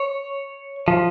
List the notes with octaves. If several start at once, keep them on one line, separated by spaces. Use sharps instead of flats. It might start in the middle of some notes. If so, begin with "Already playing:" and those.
Already playing: C#5
F3